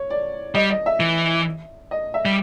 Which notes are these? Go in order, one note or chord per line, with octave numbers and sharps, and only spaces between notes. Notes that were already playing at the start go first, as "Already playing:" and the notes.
Already playing: C#5
D5
G3 D#5
D#5
E5
E3
D#5
E5
G3